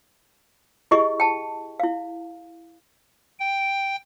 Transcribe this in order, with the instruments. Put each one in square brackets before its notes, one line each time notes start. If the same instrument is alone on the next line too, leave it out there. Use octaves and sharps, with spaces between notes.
[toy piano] E4 G4 G#4 D#5 C#6
G5 A5
E4 F5
[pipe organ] G5